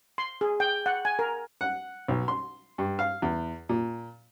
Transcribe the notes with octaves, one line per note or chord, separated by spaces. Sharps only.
C6
G#4
G5
F#5
G#5
A#4
F#5
B1
C6
G2
F5
E2
A#2